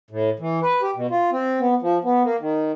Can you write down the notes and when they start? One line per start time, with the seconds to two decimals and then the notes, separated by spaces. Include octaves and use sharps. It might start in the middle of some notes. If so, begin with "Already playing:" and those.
0.10 A2
0.39 E3
0.62 B4
0.82 G4
0.96 B2
1.10 F4
1.32 C4
1.60 B3
1.82 F3
2.04 B3
2.24 A#3
2.40 D#3